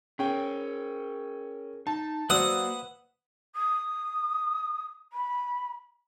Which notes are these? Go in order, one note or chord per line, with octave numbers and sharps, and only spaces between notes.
C#4 G#4 A#4 G5
D#4 A5
F#3 A#3 B4 C5 D5 F#5 D#6 E6
D#6
B5